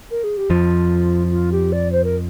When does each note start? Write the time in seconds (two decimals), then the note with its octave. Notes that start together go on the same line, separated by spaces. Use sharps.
0.11 A#4
0.23 G#4
0.37 G4
0.50 F2 F3 F4
1.31 F4
1.51 G4
1.72 D5
1.92 C5
2.04 A#4